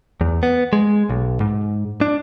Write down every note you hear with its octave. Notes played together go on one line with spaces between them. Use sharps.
E2
B3
G#3
B1
G#2
D4